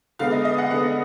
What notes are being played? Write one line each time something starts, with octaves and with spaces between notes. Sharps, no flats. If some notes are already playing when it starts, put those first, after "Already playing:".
D3 G#3 B3 F5
D#5
D#5
F#5
D3 G#3 B3